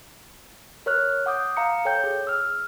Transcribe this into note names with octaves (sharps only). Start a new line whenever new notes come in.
A#4 C#5 F6 F#6
F#5 D6 D#6 G6
F5 A#5 C#7
A4 C#5 G5 G6
G#4
E6 F6